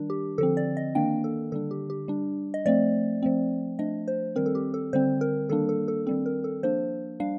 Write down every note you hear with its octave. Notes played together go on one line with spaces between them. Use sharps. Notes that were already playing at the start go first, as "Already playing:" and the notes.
Already playing: D#3 G3 D4
G4
D3 F3 C4 A4
D5
D#5
D#3 A#3 D4 G5
A4
D3 G3 D4 A4
G4
G4
G3 D4
D#5
F3 A3 C4 D5
F3 A3 C4
F3 A3 D4 D#5
C5
D#3 G3 C4 A#4
A4
G4
A4
D3 G3 C4 C5
A#4
D#3 G3 A#3 D4 A4
A4
A4
D#3 G3 C4 A4
A#4
A4
F3 A#3 D4 C5
G3 D4 F5